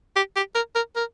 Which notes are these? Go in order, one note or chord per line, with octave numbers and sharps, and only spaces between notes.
G4
G4
A#4
A#4
A#4